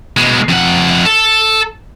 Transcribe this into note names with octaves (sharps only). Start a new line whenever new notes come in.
B2 G#3
F2 F#5
A4